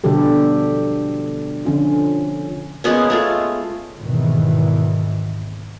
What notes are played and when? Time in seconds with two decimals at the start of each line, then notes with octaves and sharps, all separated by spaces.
0.04 B2 D3 F3 G3 G4 A4
1.65 D3 F3 C#4 F4
2.84 G#3 A#3 B3 C#4
3.10 G#3 A3 F4
4.00 G#1 E2 B2 D#3 E3